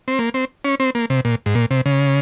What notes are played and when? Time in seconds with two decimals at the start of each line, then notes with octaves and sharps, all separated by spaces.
0.08 C4
0.19 A#3
0.34 C4
0.65 C#4
0.80 C4
0.95 A#3
1.10 C3
1.25 A#2
1.46 G#2
1.55 A#2
1.71 C3
1.86 C#3